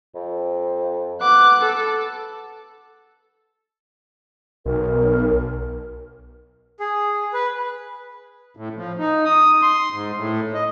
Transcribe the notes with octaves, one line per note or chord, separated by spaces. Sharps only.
F2
B3 D6 F#6
A4
B1 A#4
G#4
B4
A2
F3
D#4
D#6
C6
G#2
A2
D#5